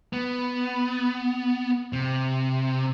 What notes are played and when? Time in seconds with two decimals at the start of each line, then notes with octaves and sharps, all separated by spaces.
0.13 B3
1.93 C3